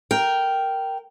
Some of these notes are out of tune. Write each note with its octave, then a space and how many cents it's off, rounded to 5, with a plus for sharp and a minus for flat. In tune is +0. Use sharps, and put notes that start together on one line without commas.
A#4 +0 G5 -10